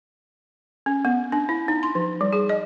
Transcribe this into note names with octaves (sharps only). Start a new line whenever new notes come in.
C#4
B3
D4
E4
D#4
C6
F3
G3
G#4
D#5